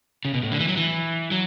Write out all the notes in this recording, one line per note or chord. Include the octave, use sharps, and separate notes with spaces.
C#3
B2
A2
D3
E3
F#3
E3
F#3